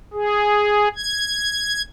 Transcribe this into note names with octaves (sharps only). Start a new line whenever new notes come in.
G#4
G#6